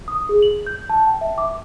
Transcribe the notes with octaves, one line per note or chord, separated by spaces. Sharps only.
D#6
G#4
F#7
G6
A5
G5
E5
D6